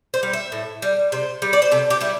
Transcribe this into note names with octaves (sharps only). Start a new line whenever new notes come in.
C5
G3
E5
A2
G3
C3 C5
G3
D5
C5
C3 A4
G4
G3 E4